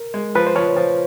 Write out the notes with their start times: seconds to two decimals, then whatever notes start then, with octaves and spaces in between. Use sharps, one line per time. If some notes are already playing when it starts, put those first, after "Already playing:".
Already playing: A#4
0.14 G#3
0.35 F3 B4
0.47 C5
0.56 F3 C#5
0.76 F3